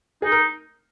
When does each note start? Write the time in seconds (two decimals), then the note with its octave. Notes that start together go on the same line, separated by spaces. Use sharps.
0.22 D#4 G#4
0.32 A#4